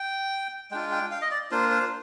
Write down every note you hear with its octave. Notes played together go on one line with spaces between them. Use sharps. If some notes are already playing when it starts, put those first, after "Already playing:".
Already playing: G5
G#3 D4 F4 G5
G5
F5
D#5
D5
A#3 D4 F4 C5
C5